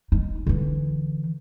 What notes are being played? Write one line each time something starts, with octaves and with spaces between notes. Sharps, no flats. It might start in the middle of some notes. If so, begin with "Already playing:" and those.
D#4
D3 E3